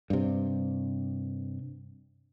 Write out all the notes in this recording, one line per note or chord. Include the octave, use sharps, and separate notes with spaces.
G2 C3